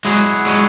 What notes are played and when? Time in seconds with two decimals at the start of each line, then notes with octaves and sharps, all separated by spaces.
0.04 F#3 G#3 E4 G#4 C#5 F#5
0.46 F#3 G#3